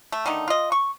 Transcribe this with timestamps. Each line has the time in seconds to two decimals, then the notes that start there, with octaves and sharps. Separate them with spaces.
0.12 A3
0.26 D3 D#3 A3 D#4
0.48 F4 D#5
0.72 C#6